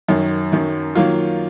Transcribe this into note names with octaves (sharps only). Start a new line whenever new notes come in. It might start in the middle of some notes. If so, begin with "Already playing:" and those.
F#2 D#3 F#3
F#2 D#3 F#3
D#3 F#3 A#3 F4